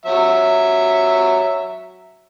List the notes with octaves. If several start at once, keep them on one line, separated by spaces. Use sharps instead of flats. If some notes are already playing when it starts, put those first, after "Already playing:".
F#3 E5